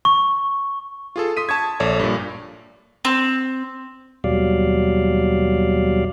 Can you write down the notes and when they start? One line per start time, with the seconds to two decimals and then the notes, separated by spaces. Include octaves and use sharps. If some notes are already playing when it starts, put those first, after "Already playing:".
0.05 C#6
1.16 F4 G#4 A4
1.37 C6 D#6 B6 D#7
1.49 A5 C#6 D#6 G#6
1.80 A#1 A4 C#5 D5
2.00 G2 A#2
3.05 C4
4.24 D#2 B2 F#3 G3 D5 F5